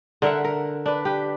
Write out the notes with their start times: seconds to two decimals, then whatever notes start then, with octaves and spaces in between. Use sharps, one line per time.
0.22 D3 A#4 E5 F#5
0.44 A#4
0.86 D4 B4
1.05 G4 B4